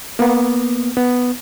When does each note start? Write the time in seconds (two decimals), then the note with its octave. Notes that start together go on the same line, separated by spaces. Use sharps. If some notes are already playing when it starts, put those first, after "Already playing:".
0.19 A#3 B3
0.97 B3